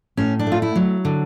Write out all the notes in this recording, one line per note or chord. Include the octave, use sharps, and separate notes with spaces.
A2 C#4
D4
A3
F4
E4
F#3
D3